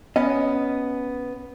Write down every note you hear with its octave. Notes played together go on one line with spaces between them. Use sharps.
B3 C#4 D#5